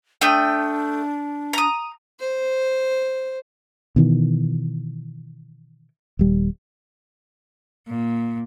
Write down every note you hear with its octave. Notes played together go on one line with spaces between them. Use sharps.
A3 D4 G5 D#6
A#5 D#6
C5
B2 D#3 E3
D#1 G3
A#2